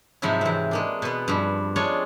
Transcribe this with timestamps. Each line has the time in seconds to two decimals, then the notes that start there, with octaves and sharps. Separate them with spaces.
0.22 G#2 C3 F3 F#3 E4
0.41 E3 C4
0.71 G#3 A#3 D4
1.02 B2 B3
1.28 G2 F3
1.76 G#3 D4 F4 C#5